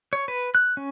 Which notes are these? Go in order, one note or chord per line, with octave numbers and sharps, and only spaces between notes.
C#5
B4
F#6
C#4